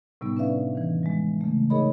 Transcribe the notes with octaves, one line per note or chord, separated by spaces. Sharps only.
A2 C3 G3 B3 D#4
C#4 D4 B4 D5 E5 F5
D#3 E3
G3 G#3
C#3 A3
D#4 G#4 A#4 C#5 D#5 B5